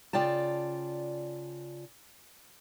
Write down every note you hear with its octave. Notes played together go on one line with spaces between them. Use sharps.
C#3 F4 D5 G5 A5